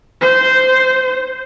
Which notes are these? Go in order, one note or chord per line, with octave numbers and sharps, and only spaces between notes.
C5